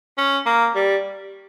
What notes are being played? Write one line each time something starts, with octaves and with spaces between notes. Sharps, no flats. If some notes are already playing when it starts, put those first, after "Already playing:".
C#4
A#3
G3